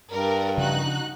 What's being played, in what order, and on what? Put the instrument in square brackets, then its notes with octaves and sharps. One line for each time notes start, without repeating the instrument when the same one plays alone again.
[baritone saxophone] G2 [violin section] A#4 D5
[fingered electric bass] C#3 F3 D4 [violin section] D#4 F#4 F#6